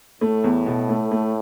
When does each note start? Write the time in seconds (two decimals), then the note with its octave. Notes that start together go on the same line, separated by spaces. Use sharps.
0.21 A2 A3
0.44 E2
0.66 B2
0.89 A3
1.11 A3